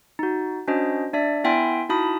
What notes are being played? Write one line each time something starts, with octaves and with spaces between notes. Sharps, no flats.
D#4 F#4
C#4 D4 F#4 C5 D#5
D4 D5 E5
B3 E4 E5 G5 G#5 C6
D#4 E4 F#4 A5 B5 D#6